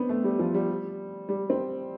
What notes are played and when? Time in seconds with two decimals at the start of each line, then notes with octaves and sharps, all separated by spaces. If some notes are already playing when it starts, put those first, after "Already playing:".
Already playing: B3 C4 D4
0.09 A3
0.24 G3
0.39 F3
0.54 G3
1.29 G3
1.50 C4